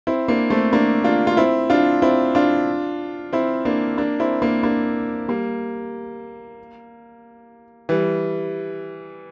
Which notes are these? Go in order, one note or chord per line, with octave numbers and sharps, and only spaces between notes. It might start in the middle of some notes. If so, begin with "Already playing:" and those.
C4 E4
A#3 D4
A3 C4
A#3 D4
D4 F4
F4
C4 E4
D4 F4
C4 E4
D4 F4
C4 E4
A#3 D4
A#3 D4
C4 E4
A#3 D4
A#3 D4
G3 A#3
E3 G3